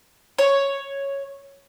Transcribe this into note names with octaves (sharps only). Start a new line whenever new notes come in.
C#5